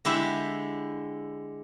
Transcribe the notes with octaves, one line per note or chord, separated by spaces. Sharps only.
D3 G#3 E4 G4 E5